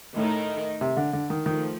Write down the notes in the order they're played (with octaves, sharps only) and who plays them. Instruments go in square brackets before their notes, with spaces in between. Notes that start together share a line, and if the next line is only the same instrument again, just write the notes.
[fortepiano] A2 [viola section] D#3 A3 D#4 A#4
[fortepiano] C3
D3
D3
D#3
[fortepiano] D#3 [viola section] F3 A3